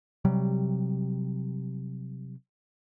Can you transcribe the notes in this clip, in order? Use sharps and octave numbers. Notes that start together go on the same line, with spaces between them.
C3 F#3 G3